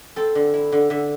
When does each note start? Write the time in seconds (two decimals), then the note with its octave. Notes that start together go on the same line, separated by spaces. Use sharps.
0.16 C4 A4
0.35 D3
0.54 E4
0.72 D3
0.90 D3 E5